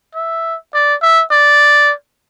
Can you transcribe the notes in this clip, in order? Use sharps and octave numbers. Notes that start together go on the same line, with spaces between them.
E5
D5
E5
D5